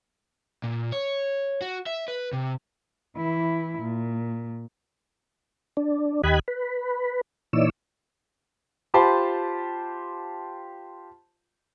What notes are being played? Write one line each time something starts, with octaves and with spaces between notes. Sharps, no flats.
A#2
C#5
F#4
E5
B4
C3
E3 E4
A#2
D4
D#2 G4 D#5 B5 F#6 G#6
B4
A#2 E3 D#4 C#5 D5 E6
F4 G4 C5 A5 B5 C6